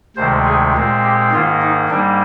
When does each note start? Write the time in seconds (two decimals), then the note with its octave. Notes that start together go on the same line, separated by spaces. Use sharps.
0.16 D2 C3 D#3 G#3 C5
0.45 G#4
0.75 A#2 G#3 C4
1.03 G4
1.32 G#2 D#3 A#3 F4
1.62 D#4
1.89 G#2 G3 A#3 D4